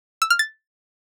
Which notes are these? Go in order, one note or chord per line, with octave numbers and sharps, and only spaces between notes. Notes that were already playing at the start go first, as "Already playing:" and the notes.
E6
F6
A6